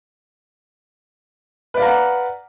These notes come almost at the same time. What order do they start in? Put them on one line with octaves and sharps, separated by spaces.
B4 D5 F5 A#5 F#5